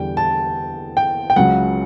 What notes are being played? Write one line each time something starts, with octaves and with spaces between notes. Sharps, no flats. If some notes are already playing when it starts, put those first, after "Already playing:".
Already playing: E2 D3 G3 G5
A5
G5
G5
C#2 C#3 F#3 F#5